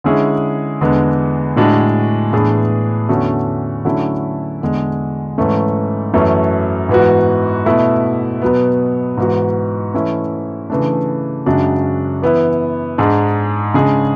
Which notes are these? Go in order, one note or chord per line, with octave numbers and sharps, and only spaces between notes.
D3 G#3 C#4 E4 G#4
E2 D3 G#3 B3
A2 G#3 D4 F#4
A2 E3 B3 D4 G#4
E2 D3 A3 C#4 F#4
D3 F#3 A3 C#4 E4
E2 D3 G#3
G#2 E3 A3 C#4
F#2 E3 A3 C#4
G#2 E3 B3 F#4
B2 A3 E4
B2 F#3 B3
G#2 E3 B3 F#4
E3 A3 C#4 E4
C#3 E3 A3 D4
F#2 C#3 G#3 D4 F#4
E3 B3 E4
G#2 G#3 D4 G#4
C#3 G#3 D4 G#4